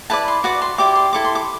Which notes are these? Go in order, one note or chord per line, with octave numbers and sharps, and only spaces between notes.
E4 B4 D5 A5
C6
F#4 B4 D5 D6
C6
E4 G4 D5 D6
C6
E4 A4 D6
C6
D6